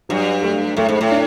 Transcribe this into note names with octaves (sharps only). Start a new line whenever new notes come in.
G2 F#3
A3
A2 A3
G#2
A2
D4